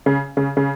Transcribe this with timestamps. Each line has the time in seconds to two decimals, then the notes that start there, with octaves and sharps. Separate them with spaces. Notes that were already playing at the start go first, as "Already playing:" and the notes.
0.06 C#3
0.37 C#3
0.57 C#3